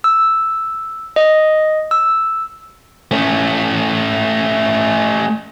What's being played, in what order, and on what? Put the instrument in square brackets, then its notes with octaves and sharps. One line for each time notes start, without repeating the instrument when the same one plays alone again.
[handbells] E6
D#5
E6
[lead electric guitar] A3 C#4